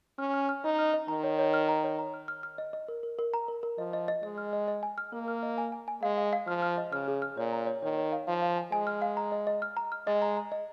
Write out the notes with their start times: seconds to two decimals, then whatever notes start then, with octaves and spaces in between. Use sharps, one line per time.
0.18 C#4 F6
0.34 F6
0.49 F6
0.64 D#4 D#5
0.79 F6
0.94 D#5
1.08 D#3 A#5
1.24 C#5
1.39 C#5
1.54 F6
1.69 A#5
1.84 C#5
1.99 A#5
2.14 F6
2.28 F6
2.43 F6
2.58 D#5
2.73 D#5
2.88 A#4
3.03 A#4
3.19 A#4
3.34 A#5
3.48 A#4
3.63 A#4
3.78 F3 D#5
3.93 D#5
4.08 D#5
4.23 G#3 D#5
4.38 F6
4.53 D#5
4.68 D#5
4.83 G#5
4.98 F6
5.13 A#3 A#4
5.28 F6
5.43 D#5
5.58 G#5
5.72 G#5
5.88 G#5
6.02 G#3 F5
6.17 F5
6.33 F5
6.47 F3 F6
6.62 F6
6.78 D#5
6.92 C#3 F6
7.08 G#4
7.22 F6
7.37 A#2 C#5
7.53 A#5
7.67 C#5
7.82 D#3 C#5
7.97 C#5
8.12 F5
8.27 F3 F5
8.42 F5
8.57 G#5
8.71 G#3 G#5
8.87 F6
9.02 F5
9.17 A#5
9.32 D#5
9.47 D#5
9.62 F6
9.77 A#5
9.92 F6
10.07 G#3 D#5
10.22 A#5
10.37 A#5
10.52 D#5